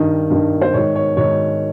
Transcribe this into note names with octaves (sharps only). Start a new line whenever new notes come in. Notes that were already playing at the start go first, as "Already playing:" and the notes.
Already playing: G2 D#3 D#5
G2 D#3
C5
G#2 D#3 C#5
C#5
G#2 D#3 C#5